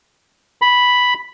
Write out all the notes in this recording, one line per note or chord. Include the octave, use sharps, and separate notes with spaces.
B5